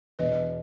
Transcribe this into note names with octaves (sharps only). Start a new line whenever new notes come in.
E1 E2 B2 B4 D#5